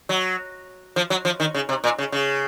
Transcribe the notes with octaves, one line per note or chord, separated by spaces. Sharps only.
F#3
F3
F#3
F3
D#3
C#3
C3
A#2
C#3
C#3